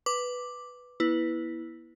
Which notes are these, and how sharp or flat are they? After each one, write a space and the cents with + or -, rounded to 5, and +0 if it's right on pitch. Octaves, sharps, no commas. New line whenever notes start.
B4 +0 D6 +0
B3 -40 E4 -5 B4 +0